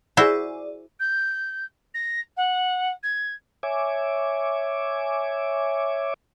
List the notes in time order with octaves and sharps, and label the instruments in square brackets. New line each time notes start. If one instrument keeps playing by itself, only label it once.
[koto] E4 F#4 C5 [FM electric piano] G#4 D5
[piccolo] G6
A#6
F#5
G#6
[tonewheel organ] C#5 E5 G#5 D6